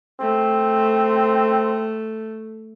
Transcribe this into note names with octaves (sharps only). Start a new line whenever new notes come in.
A3 C4